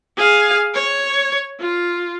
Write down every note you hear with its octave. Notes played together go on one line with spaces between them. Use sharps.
G#4 F5
C#5
F4